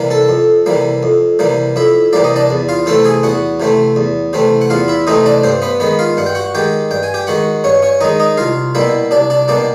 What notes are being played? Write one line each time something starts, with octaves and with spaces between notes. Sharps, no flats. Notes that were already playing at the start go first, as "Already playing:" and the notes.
Already playing: C3 E3 G3 A#3
A4 A5
F2
C3 E3 G3 A#3
F2
C3 E3 G3 A#3
F2 E4 E5
C3 E3 G3 A#3 D5
D#5
D4 D5
E2
F4 F5
C3 E3 A3 C4 A4 A5
G#4 G#5
E2 F#4 F#5
C3 E3 A3 C4
E2
C3 E3 A3 C4
F#5
E2 F4 F5
E4 E5
C3 E3 A3 C4 D#4 D#5
D4 D5
G2 C4 C5
B3 B4
D#3 G#3 B3 B4
F4 F5
G2 F#5
G5
F#4 F#5
D#3 G#3 G4 G5
G2 G5
G#5
G4 G5
D#3 G#3 F#4 F#5
G2 C#4 C#5
C#4 C#5
D#3 G#3 D#4 D#5
D#4 D#5
C2 F4 F5
B2 G3 A#3 E4 E5
C2 D4 D5
D4 D5
B2 G3 A#3 D4 D5